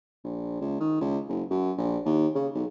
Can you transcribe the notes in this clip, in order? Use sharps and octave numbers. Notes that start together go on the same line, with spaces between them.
A#1
C#2
D#3
C#2
F#1
F#2
A#1
D#2
C#3
B1